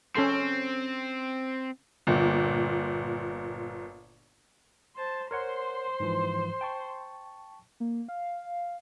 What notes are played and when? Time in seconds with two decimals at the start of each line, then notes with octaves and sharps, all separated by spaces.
0.15 C4 C#4 A4 C6
2.07 G1 A#2
4.95 C5 A5
5.31 A#4 C5 C#5 F#5 C6
6.00 G#2 E3 F3
6.61 G5 A5 C#6
7.80 A#3
8.08 F5